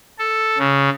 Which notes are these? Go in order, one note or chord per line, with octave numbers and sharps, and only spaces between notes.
A4
C#3